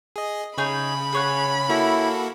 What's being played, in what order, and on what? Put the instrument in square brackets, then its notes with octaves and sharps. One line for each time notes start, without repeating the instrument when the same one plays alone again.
[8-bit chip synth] G#4 D#5
[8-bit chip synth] C#3 [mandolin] D#4 G#4 C#5 [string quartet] B5
[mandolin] G#4 C#5 F#5
[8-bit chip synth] A#3 F#4 A4 [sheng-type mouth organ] E4